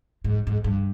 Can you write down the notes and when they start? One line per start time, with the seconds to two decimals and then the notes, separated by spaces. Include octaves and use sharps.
0.24 G#2
0.47 G#2
0.64 G2